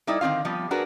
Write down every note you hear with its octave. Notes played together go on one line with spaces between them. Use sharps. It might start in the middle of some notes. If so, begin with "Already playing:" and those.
G3 D#4 E4 A4 D5
D3 D#3 C4 F4 F5
F3 G3 B3
D4 F#4 G#4 A#4 B4